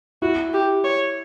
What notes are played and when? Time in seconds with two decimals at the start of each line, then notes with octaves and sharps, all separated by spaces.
0.22 E4 F#4
0.53 G4
0.84 C#5